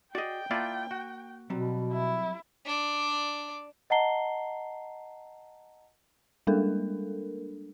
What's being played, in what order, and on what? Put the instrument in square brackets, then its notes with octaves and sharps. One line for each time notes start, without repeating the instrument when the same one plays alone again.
[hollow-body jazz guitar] F#4 G#4 [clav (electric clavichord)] D5 D#5 [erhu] G5
[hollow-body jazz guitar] A#3 A5 [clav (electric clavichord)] E4 F4 D5
[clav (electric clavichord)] F#4
[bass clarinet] B2 [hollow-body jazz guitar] F#3 G3 C4
[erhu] E4
[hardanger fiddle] D4 D5
[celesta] D#5 F#5 A5 A#5 C7 G7
[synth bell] G3 G#3 A#3 D4 A4 A#4